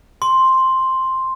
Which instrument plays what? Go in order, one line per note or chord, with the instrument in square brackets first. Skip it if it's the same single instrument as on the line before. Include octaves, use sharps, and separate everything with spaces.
[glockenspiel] C6